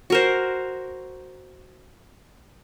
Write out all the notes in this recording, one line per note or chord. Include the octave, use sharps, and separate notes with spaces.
F#4 A#4 C5